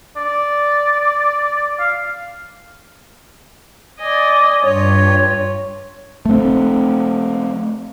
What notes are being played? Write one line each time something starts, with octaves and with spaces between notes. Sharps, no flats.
D5
F5
D5 D#5 G#5
G2 F4 C#5
A3 C4